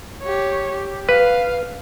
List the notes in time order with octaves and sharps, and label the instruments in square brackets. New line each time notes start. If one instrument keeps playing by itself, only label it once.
[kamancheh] G4 C#5
G4
[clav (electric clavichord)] B4 [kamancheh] F5